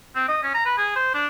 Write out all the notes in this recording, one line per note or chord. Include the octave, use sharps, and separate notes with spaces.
C4
D#5
C#4
A#5
B4
G#4
C5
D4